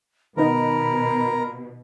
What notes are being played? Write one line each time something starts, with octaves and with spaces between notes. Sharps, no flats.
B2 D#3 B3 D#4 A#4 B5